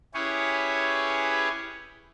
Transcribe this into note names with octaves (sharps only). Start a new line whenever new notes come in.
C#4 E4 G4 G#4 B4 C#5